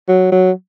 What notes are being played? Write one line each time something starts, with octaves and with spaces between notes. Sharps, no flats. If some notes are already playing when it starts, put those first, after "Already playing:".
F#3
F#3